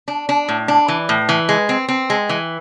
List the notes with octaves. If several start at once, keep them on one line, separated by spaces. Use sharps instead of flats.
D4
D4
A2
D4
E3
A2
E3
G#3
C4
C4
G#3
E3